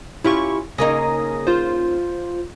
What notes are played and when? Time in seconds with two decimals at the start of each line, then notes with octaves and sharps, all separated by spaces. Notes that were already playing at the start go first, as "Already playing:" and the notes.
0.24 C#4 E4 F4 G4 C#6
0.78 C#3 A#3 D#4 G#5 D#6 A#6
1.47 F4 C5